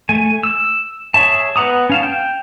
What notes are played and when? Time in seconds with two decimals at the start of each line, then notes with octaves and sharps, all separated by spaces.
0.09 A3 G#5
0.43 E6
1.14 G#4 C#5 E5 A5
1.56 B3 B4 F#5 A#5 D#6
1.90 C#4 F5 A5
2.03 G5